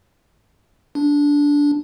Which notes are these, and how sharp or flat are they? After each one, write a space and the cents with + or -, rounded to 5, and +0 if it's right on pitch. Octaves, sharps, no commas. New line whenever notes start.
D4 -15